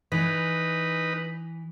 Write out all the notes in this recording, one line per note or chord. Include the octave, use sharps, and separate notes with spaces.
E3 D#4 B4